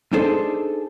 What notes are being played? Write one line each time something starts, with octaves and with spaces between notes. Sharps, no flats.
D4 D#4 G#4 A4 C5